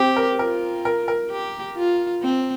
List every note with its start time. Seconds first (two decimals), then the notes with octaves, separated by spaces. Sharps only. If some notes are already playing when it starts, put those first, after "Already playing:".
Already playing: C4 G4
0.16 A#4
0.39 F4 A#4
0.85 A#4
1.08 A#4
1.31 G4
1.77 F4
2.22 C4